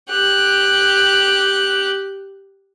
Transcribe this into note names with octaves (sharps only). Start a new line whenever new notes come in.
G4 F#6